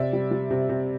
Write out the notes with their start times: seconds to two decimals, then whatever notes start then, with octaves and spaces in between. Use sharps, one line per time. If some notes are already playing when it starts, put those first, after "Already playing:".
Already playing: C3 D5 E5
0.13 G3
0.31 G3
0.50 C3
0.69 C3